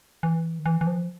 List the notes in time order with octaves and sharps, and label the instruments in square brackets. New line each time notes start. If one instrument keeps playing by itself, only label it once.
[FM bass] E3
D#3
E3
E3
F3